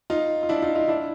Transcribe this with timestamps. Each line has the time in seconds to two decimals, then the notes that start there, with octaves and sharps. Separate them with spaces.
0.10 D#4 F4
0.43 F4
0.49 D4 E4
0.62 D#4 F4
0.75 D#4 F4
0.88 D4 E4